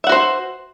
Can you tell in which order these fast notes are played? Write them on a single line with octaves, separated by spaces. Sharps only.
E5 F#5 F#4 C5